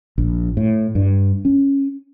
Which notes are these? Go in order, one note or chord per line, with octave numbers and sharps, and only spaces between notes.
A#1
A2
G2
C#4